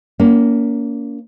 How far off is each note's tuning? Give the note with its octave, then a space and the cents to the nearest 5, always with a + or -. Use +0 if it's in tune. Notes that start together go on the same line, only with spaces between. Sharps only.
A#3 +0 C#4 +40